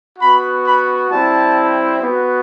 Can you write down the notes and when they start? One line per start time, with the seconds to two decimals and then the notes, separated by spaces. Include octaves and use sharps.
0.19 B3 F#4 B5
0.65 B5
1.10 G3 C4 E4 A5
2.02 B3 F#4